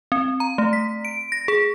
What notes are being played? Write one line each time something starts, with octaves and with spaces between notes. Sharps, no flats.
C4
A#5
A3
B6
D7
A#6
G#4